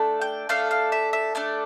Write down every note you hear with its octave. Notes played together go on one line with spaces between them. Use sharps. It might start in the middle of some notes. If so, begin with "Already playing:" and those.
Already playing: A3 D4 A4
G5
A3 D4 A4 F5
F5
E5
E5
A3 D4 A4 D5